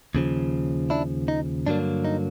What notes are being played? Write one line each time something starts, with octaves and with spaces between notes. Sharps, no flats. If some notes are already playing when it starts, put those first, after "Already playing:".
D#2 C#3 F3
D4 E4
D#4
G2 D3 F#3 A#3 D4
D#4